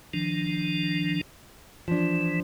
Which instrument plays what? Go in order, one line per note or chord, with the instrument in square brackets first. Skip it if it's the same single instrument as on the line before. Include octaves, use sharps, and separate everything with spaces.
[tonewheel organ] D#3 F3 D4
[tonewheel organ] E3 [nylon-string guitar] F3 D4